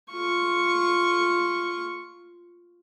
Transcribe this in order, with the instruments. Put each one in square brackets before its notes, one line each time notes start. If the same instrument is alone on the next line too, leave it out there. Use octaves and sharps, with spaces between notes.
[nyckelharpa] F4 C#6